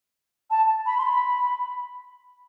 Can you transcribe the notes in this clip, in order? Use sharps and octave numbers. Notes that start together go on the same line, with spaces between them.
A5
B5
C6
B5